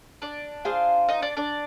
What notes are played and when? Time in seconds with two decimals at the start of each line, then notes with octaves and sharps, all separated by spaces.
0.22 D4 D5
0.65 F4 G#4 C5 F5
1.09 D#4 D#5
1.22 D4 D5
1.37 D4 D5